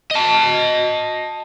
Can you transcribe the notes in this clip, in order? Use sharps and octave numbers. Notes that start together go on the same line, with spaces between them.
D#5 A5